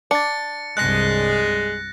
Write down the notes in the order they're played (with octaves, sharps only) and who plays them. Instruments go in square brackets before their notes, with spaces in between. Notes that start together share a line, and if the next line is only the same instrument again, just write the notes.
[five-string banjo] D4 [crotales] A6 C#7
[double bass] C2 G2 [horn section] G#3 [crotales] F#6 A#6